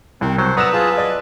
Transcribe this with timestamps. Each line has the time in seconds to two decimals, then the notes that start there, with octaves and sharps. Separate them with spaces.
0.21 C2 C4 A#4
0.38 F#3 C5
0.57 B4 D5 F#5 A#5 D#6 E6 E7
0.73 F4 G#4 A5
0.98 D5 D#5